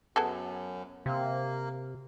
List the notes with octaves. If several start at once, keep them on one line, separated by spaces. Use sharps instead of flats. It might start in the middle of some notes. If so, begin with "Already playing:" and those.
F#2 B3 G#4 A4
C3 A#3